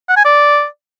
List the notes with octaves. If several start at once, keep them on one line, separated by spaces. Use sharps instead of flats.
F#5
G#5
D5